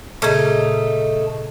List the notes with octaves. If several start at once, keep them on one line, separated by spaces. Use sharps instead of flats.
A#2 C#3 A3 D#4 G#4